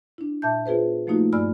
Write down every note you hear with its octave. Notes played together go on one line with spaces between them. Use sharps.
D4 E4
A#2 E5 A5 G6
B3 F4 G#4 B4 C5
F3 A3 A#3 D#4 F4 F#4
G2 D5 G#5 B5 E6 F6